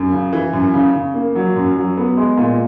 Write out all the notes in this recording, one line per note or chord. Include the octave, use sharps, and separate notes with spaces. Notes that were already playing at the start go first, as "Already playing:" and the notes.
Already playing: F#2
C#3
E3
F#2
C#3
C#3
A#3
F#3
F#2
F#3
B3
G#3
A#2